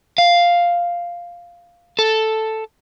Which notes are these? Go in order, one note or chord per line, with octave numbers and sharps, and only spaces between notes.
F5
A4